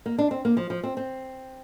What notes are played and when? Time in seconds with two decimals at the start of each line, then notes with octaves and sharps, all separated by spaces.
0.06 A#3
0.18 D4
0.31 C4
0.45 A#3
0.57 F3
0.70 F3
0.84 C4
0.97 C4